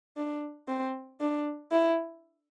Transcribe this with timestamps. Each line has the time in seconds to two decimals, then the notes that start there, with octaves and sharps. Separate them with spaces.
0.17 D4
0.68 C4
1.21 D4
1.72 E4